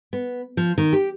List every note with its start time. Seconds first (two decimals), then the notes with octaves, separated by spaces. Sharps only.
0.13 B3
0.57 F3
0.78 D#3
0.93 G4